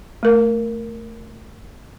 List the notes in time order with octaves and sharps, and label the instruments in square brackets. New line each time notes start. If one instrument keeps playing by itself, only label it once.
[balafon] A3 A#4